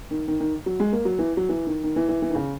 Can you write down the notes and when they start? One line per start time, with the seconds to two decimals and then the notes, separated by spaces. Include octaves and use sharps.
0.11 D#3
0.28 D#3
0.40 D#3
0.66 F#3
0.80 G#3
0.93 A#3
1.05 F#3
1.19 E3
1.37 F#3
1.49 E3
1.67 D#3
1.84 D#3
1.96 E3
2.09 E3
2.22 E3
2.30 D#3
2.35 C#3